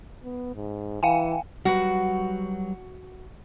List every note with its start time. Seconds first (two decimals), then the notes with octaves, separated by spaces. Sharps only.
0.24 B3
0.55 G#2
1.03 E3 F5 G5 G#5
1.65 F#3 G3 F#4 B4